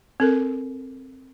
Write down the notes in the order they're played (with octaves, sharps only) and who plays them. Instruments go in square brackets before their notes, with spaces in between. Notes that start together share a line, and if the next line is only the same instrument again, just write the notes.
[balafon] C4 A4 A#4